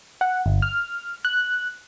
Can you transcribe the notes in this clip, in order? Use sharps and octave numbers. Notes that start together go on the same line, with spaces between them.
F#5
G1
F6
F#6